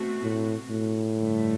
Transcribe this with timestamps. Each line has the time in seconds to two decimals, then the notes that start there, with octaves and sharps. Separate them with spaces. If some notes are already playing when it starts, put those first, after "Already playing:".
Already playing: B2 A3 C4 F#4
0.22 A2
0.70 A2
1.17 G2 D3 A3